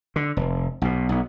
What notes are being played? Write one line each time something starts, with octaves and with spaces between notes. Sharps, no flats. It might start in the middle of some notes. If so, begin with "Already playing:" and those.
D3
F1
B1 B2
B1 B3